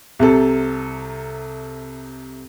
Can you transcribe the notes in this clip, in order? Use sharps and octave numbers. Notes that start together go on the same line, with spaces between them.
C2 C3 A4